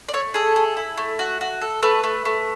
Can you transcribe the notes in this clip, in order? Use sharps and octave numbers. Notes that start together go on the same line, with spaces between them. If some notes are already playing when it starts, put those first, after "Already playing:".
D5
A3 C#5
G#4 A4
G#4
E4
A3
F#4
F#4
A4
A3 B4
A3
A3